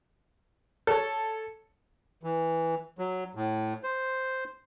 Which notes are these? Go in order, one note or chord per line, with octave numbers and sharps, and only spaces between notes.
A4 C#5
E3
F#3
A2
C5